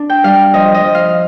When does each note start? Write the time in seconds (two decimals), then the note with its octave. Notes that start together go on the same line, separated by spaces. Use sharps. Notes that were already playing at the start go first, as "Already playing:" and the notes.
Already playing: D4
0.10 G5
0.24 G3 F5
0.54 F3 D#5
0.74 D#5
0.84 F3
0.95 F5